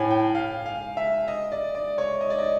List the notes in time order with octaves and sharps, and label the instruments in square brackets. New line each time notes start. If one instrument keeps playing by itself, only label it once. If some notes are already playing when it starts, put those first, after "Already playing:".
Already playing: [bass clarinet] A2 [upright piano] G#5
[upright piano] G5
F5
F5
E5
D#5
D5
D5
C#5
D#5
D5
D#5